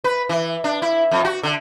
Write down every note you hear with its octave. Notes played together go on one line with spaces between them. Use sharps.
B4
E3
D4
E4
F2
F#4
D3